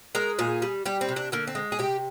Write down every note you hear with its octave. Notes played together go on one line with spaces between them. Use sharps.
G#3 A#4
A#2 G#4
G3
G3 G4
C4
C3
D4
D3 A#3
C4
G#3
G#4
C3 G4